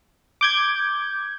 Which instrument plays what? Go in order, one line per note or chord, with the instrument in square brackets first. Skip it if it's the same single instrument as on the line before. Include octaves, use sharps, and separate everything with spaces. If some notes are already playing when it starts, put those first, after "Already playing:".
[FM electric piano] D6 G6 G#6